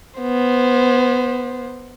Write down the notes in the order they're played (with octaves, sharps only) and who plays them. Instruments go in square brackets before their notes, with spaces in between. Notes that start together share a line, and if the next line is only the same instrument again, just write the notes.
[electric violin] B3 C5